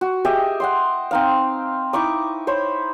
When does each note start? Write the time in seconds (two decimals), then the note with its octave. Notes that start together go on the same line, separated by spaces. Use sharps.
0.01 F#4
0.25 G4 G#4 D#5 E5
0.60 F#5 G5 C6
1.11 C4 D#4 F5
1.93 D#4 E4 C#6 D6
2.47 C5 C#5 B5